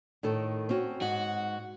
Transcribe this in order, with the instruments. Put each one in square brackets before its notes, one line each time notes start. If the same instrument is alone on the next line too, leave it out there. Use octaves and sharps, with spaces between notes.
[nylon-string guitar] A2 D#3 A4
C4 C#4 F#4
[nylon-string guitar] G#2 [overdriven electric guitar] F#4